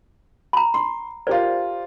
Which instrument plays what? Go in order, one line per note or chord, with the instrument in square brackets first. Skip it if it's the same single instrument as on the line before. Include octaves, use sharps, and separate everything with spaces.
[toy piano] A#5 B5
[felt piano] C6
[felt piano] F4 G4 A#4 [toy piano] C5 D5